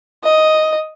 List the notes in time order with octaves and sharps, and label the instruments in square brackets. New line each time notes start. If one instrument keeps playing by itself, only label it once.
[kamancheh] D#5